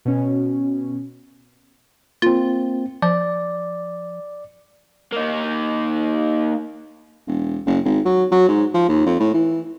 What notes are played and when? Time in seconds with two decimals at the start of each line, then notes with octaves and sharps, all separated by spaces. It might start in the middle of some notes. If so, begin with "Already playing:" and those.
0.05 B2 C#4
2.22 A#3 C4 F4
3.02 F3 D5
5.13 A#3 D#4
7.27 E1
7.66 F#1
7.85 G#1
8.05 F#3
8.31 F#3
8.48 G#2
8.74 F3
8.88 D#2
9.06 F2
9.20 A2
9.34 E3